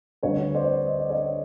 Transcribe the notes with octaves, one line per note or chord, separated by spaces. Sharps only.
D2 D3 G3 C4 B4 C#5
C5 D5
D#5
D5
C#5 D#5